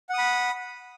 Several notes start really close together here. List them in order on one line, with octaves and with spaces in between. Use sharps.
F#5 D#6 B5